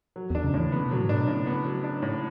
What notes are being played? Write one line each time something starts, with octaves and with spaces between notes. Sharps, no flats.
F#3
E2 D4
C#3
A2 E3
C#3 B3
B2 F#3
G#2
B2 D4
A2 C#3
B3
F#3
D4
A2